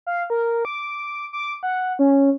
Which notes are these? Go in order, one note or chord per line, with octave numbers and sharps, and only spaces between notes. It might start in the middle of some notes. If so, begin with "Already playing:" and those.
F5
A#4
D6
D6
F#5
C#4